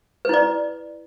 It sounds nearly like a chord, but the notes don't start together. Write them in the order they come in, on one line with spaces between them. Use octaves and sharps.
B4 E4 D5